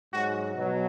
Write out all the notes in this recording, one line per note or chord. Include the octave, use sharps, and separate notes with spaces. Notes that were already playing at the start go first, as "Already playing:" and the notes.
G#2 F#3 F#4
B2 F#3